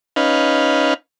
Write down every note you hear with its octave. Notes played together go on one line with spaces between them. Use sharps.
C#4 D#4 B4 F5